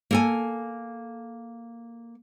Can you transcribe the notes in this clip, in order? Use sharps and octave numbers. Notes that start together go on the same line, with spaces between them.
A#3 A4 G#5